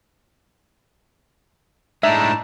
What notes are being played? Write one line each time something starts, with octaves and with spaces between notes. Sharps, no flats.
A2 G#3 D4 D#4 E5 A5